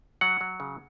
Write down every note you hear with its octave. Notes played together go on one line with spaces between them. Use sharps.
F#3 F#5
F#3
C#3